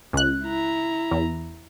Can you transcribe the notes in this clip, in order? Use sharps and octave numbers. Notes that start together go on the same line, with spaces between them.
C#2 F#6
E4 A#5
E2